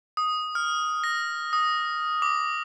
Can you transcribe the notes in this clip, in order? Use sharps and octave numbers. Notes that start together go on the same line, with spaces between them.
D#6
F6
A#6
D#6
D6